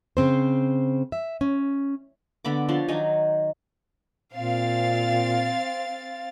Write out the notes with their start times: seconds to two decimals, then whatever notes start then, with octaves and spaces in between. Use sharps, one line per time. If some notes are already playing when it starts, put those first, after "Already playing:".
0.17 C#3 C4 C5
1.12 E5
1.41 C#4
2.45 D3 B3 B5 D6
2.69 F3 D4 C#5 C6
2.88 D#3 F#3 D#4 G#5
4.33 A#2 C4 F5 A6